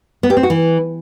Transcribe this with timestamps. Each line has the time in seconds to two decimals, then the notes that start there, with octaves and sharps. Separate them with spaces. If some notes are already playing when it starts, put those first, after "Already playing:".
0.23 B3
0.30 G4
0.37 C4
0.43 F#4
0.50 E3